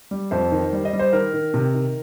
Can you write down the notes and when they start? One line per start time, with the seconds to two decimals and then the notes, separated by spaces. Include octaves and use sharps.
0.11 G3
0.31 F2 C5
0.52 D#3
0.73 G3
0.85 D#5
0.93 G3
0.99 C5
1.13 D#3 A#4
1.34 D#3
1.54 C3
1.74 D#3